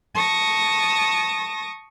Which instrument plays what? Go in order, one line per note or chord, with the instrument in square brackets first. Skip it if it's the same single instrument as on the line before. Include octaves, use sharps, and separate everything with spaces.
[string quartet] A5 C#6 D#6 A#6